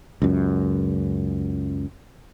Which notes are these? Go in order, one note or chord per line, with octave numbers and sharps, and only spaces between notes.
C#2 F#2